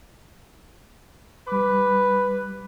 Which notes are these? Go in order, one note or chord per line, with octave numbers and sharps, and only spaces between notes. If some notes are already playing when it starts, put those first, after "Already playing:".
G3 B4 D6